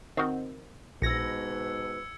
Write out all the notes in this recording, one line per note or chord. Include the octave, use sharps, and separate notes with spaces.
D#3 C4 F#4
A#1 G#2 B2 B4 E6 G#6 A#6 C#7